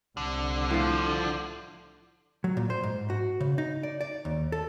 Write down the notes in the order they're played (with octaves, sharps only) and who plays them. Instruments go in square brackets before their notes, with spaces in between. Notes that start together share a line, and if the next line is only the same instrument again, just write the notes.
[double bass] C2 [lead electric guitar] D3
[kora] A2 F4 [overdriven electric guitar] F3
[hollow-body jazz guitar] F#3
A#2
C5
G#2
F#4
C#3
D#4
D5
D5
D#2
A4